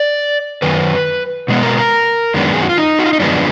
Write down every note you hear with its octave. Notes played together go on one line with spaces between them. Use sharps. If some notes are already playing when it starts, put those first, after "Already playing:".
Already playing: D5
F#2 D#3 B4
B2 G#3 B3
A#4
A#4
F#2 D#3 G#3 B3 D4
G#4
F#4
F4
D#4
F#4
F4
D#4
F#2 D3 F3 G#3 B3 D4